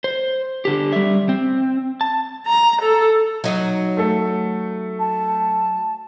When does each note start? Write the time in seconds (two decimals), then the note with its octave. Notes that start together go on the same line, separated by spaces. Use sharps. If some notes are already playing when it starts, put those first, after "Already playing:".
0.04 C5
0.65 D3 G4
0.93 G3 E5
1.29 C4
2.01 A5
2.47 A#5
2.82 A4
3.44 F#3 D#4
3.97 A3 A4
4.99 A5